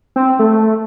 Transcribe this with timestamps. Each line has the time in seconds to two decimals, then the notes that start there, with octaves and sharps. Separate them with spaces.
0.16 C4
0.39 A3